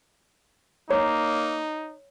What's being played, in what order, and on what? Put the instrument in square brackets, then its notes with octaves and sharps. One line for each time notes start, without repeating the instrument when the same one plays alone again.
[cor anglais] A#3 [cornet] D#4 [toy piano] C#5